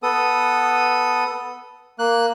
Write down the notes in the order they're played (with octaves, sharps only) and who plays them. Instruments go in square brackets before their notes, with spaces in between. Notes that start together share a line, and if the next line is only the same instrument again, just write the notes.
[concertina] B3 A4 D#6
A#3 F#6